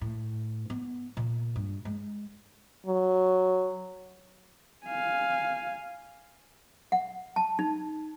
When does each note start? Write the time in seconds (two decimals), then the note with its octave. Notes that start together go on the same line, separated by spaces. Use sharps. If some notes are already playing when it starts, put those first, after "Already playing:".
0.01 A2
0.70 B3
1.17 A#2
1.56 G2
1.85 G#3
2.87 F#3
4.86 F5 G#5
6.92 F#5
7.36 A5
7.59 D#4